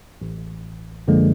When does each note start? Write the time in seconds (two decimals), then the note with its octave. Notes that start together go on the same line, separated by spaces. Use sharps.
0.22 A1
1.07 A#1 F#2 D3 F3 G#3 A#3